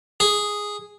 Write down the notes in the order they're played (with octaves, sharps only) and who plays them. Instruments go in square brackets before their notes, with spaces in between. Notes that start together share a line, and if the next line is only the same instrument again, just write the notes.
[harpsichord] G#4